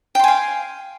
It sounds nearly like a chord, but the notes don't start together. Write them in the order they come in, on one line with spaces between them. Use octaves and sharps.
G5 C6 G#5 F5